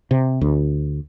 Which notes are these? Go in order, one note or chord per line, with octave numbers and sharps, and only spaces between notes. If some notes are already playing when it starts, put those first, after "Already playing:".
C3
D2